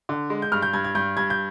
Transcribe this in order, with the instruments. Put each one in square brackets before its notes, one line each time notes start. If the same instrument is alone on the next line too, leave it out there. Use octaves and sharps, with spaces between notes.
[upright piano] D3
G#3
G6
G2 F6
G6
G2 G#6
G#6
G2 G6
G2 G#6
G6